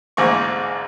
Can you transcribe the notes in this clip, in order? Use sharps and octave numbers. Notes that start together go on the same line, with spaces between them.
A1 D2 G#2 A#3 C#6